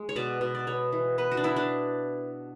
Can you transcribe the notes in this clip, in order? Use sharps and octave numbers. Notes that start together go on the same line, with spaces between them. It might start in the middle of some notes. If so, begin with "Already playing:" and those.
Already playing: G#3
C#5
B2 D5
B2
D5
B3 C#5
E3
B3 B4
F#4
D4
B3 E4
D4